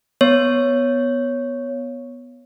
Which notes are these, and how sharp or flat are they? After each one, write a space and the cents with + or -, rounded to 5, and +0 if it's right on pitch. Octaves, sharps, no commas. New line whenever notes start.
B3 +0 C#5 +0